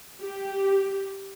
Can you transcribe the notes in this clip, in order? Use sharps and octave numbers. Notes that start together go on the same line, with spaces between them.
G4